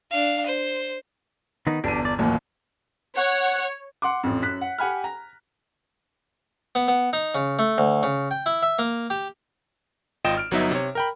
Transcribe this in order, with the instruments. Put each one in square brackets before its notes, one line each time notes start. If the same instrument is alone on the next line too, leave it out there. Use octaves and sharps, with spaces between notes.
[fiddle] D4 F5
C5
[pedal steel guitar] D#3 B3 D#4
[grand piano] G1 E2 D#7 [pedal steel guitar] D4 G4
[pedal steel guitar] D5
[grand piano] A1 D#2 A#2 [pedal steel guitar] F#3 A#3
[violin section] C#5 [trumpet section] F#5
[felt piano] F#5 C6 D6
A1 F2
F#2 F#6 B6
F#5
G4 F#5 G#5 B5 F6
A#5
[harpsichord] B3
B3
D#4
C#3
A3
D2
C#3
G5
E4
E5
A#3
G4
[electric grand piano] G#1 F4 D#5 G5 E7
F6 D7
G1 F#3 B3 D#4 E5
C3 C#5
A#4 G5 B5